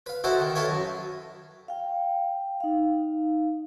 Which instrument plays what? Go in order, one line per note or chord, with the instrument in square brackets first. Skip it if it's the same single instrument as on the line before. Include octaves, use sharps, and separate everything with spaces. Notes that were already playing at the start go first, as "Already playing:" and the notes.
[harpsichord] B4 F5
D#4 E4 F#4 A4 C5
D#3
E4 F4 A4 B4 C#5
F#2
[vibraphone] F5 G5
D#4 F5